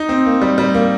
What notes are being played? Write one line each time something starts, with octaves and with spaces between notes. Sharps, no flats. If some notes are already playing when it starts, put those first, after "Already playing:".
Already playing: D#4
C4
A#3
G3
G3
A#3